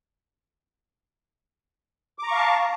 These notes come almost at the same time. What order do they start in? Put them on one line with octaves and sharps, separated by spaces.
D6 A#5 C#6 F5 A5